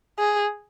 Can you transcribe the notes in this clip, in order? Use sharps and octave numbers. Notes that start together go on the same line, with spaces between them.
G#4